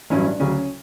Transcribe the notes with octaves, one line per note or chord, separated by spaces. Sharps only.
A1 G2 F#3 C#4 E4
D4
D2 C#3 F#3 C#4